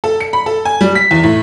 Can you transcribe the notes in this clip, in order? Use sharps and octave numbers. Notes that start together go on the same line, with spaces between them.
A4
C#7
B5
A4
G#5
G3
B6
E2
A2